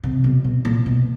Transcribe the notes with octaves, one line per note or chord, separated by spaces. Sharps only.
C3
B2
B2
A#2
B2